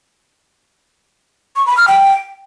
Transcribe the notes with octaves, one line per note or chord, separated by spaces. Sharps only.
C#6
B5
F6
G5